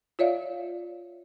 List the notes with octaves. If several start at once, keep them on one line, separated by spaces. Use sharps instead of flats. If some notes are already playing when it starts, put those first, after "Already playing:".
F4 C#5 D5 E5 F5